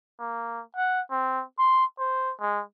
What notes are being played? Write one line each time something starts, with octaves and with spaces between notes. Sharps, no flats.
A#3
F#5
C4
C6
C5
G#3